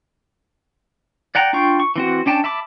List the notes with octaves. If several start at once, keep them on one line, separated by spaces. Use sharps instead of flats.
D5 F#5 G5 A#5
D4 F4 G5 C#6
C#6
E3 C4 F#4
C#4 D4 G5 A5
E5 A5 B5 D6